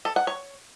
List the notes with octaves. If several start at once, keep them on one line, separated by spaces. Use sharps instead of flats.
A4
F#5
C#5